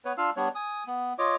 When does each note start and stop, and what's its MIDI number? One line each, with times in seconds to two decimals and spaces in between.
0.05 0.13 59
0.05 0.13 71
0.05 0.13 73
0.18 0.30 62
0.18 0.30 65
0.18 0.30 77
0.18 0.30 88
0.37 0.49 55
0.37 0.49 59
0.37 0.49 62
0.37 0.49 73
0.55 0.84 80
0.55 0.84 87
0.87 1.13 59
1.19 1.36 65
1.19 1.36 73
1.19 1.36 75
1.19 1.36 86